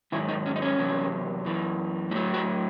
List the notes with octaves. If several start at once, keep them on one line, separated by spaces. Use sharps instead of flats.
G#2 D#3 F#3 E4
D#4
C#4
D#4
C#4
E2 C3 F#3
F#2 E3
A2 F#3 E4
F#4